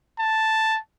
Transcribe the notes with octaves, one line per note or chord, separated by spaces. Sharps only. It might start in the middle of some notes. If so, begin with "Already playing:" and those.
A5